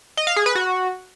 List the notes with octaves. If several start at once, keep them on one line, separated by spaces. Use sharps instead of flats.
D#5
F5
G#4
B4
F#4